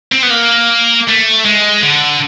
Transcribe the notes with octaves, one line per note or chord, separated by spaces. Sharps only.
C4
B3
A#3
A3
G#3
D3